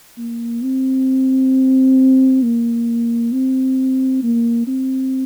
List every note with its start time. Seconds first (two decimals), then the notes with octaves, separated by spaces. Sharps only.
0.18 A#3
0.63 C4
2.43 A#3
3.32 C4
4.23 A#3
4.67 C4